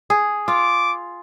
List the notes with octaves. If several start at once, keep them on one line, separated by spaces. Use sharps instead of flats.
G#4
F4 D6